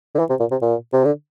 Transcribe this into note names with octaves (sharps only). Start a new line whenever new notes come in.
D3
E3
C3
A#2
C3
A#2
C3
D3